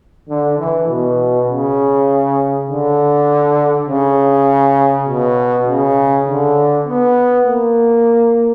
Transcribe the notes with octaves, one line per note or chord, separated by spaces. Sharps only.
D3
E3
B2
C#3
D3
C#3
B2
C#3
D3
B3
A#3